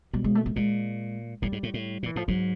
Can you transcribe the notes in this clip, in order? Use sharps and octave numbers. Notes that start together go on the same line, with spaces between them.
B2 G3
G#3
A3
A3
A#2 G#3
A2 G3
G#2
A2
A2
A#2 E3
A2 F3
G#2 F#3